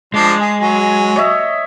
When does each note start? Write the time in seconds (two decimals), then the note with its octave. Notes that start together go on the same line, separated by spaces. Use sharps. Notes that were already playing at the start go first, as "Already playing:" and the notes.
0.14 F3 G#3 D4 C6
0.41 G#4
0.60 F#3 G#5
1.16 C#5 D#5 E5